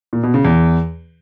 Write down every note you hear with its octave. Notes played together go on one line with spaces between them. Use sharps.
A#2
B2
C#3
E2